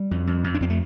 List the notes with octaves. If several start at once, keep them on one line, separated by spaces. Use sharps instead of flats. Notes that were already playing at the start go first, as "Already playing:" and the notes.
Already playing: G3
F2
F2
F2
D4
F2 C4
A3